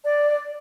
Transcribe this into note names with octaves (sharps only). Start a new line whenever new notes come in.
D5